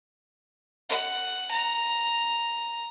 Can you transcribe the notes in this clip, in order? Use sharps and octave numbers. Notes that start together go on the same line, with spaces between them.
F#5
A#5